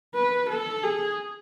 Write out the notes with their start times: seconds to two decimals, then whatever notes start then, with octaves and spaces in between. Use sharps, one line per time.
0.15 B4
0.49 A4
0.83 G#4